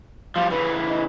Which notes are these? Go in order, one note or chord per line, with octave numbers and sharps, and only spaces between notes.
F3 G3 F5
C#3 E3 B4
D#5